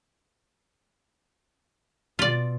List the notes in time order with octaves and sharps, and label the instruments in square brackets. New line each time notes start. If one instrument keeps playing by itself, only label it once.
[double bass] B2 [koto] F4 D5